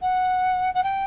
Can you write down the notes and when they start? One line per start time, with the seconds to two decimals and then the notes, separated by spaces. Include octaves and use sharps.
0.02 F#5
0.74 F#5
0.83 G5